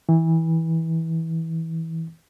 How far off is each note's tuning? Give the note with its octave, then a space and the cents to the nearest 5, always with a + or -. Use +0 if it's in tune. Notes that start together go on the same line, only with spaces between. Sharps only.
E3 -20